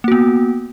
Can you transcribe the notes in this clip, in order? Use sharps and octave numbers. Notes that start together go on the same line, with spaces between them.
A#3 B3 F#4